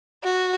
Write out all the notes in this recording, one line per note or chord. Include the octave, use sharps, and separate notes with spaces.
F#4